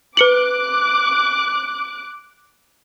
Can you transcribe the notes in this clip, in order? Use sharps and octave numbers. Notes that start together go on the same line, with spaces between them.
B4 D6 F#6 C#7 F#7